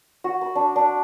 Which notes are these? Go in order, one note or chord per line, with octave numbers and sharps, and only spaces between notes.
F#4
B5
D4
D4